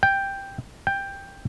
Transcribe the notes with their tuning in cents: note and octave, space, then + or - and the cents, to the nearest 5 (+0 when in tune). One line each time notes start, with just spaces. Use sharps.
G5 +5
G5 +10